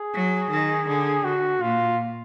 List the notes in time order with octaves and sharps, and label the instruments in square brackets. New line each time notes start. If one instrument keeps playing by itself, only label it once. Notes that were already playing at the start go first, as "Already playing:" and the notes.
Already playing: [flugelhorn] G#4
[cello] F#3
D#3
D3
[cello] D3 [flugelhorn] F#4
[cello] A#2 [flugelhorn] F4